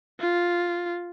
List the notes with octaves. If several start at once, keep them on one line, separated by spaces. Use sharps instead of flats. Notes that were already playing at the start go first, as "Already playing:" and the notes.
F4